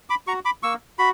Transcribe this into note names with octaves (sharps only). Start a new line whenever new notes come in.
B5 D6
F#4 A#5 C#6
B5 D6
A#3 C#6 E6
F#4 B5